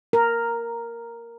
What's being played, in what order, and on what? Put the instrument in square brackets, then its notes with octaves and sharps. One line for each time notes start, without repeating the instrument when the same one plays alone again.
[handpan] A#4